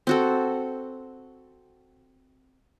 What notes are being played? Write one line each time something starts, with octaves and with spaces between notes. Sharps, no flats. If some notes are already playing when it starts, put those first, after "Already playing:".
C4 F#4 A4